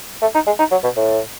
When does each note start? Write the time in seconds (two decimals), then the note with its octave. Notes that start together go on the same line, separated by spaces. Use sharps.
0.22 A3
0.35 D#4
0.47 G#3
0.59 D#4
0.72 F#3
0.84 B2
0.97 A2